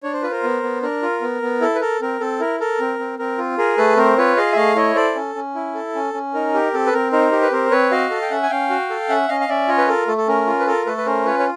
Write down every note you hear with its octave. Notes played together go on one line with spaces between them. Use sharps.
D4 C#5
C5
F4 B4
A#4 C5
B3
B3
D4 A#4
F4
B3
B3
E4 A4
B4
A4 A#4
C4 A#4
C4 A4
E4 A#4
A4 A#4
C4
C4
C4 A#4
F4
G#4 A#4
A3 A4 B4
C4 A#4 C5
F4 B4 C#5
G#4 D#5 F5
E5
A3 D#5 F5
E4 C#5 D#5
A4 C5 D5
C#4
C#4
E4
A4
C#4
C#4
D#4 A#4
G4
C4 A4
B4
C4 A#4
D#4 A#4 C5
G4
B4
C4 A#4 C5
C4 B4 C#5
F#4 D#5 F5
A4
G5
C#4 E5 F#5
G#5
C#4 F5 G5
F#4
A4
C#4 E5 F#5
C#4 D#5 F5
F5
C#4 D5 E5
F4 C#5 D#5
B4
A4 A#4
A3 A4
A4
C#4 A#4
F4
B4
A4 A#4
A3 A4 B4
B4
C#4 A#4 C5
F4 B4 C#5
C#5